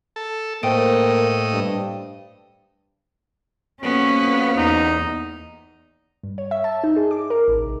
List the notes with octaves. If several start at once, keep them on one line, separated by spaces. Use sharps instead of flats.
A4
A2 A#3 C5 D#5 G5 D7
G2
F2 B2 A#3 B3 C#4
E2 D#4
G2
C#5
E5
A5
D#4
G#4
D6
A#4
A1
C2